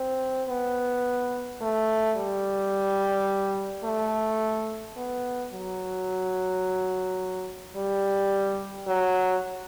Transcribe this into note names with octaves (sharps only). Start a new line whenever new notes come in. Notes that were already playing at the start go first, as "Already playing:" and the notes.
Already playing: C4
B3
A3
G3
A3
B3
F#3
G3
F#3